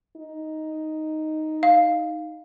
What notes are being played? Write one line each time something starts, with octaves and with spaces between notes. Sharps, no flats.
D#4
F5